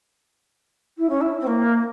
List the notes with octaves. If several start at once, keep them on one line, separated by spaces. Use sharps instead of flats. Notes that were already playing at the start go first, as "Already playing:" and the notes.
E4
C#4
E4
C4
A#3